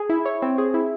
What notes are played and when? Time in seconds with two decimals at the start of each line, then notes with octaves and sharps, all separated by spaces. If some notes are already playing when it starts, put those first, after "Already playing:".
Already playing: G#4
0.09 E4
0.25 C#5
0.42 C4
0.58 G#4
0.74 E4